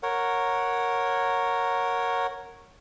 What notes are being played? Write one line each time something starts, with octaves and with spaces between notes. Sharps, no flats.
A#4 C#5 F#5